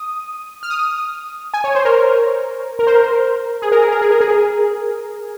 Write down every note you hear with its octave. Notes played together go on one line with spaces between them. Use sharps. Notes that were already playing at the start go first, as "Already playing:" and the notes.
Already playing: D#6
F6
D#6
G#5
C#5
C5
A#4
A#4
C5
A#4
G#4
A#4
G#4
A#4
G#4
A#4
G#4